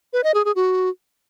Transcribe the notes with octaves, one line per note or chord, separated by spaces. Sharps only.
B4
D#5
G#4
G#4
F#4